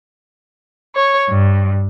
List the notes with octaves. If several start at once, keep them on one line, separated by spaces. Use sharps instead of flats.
C#5
G2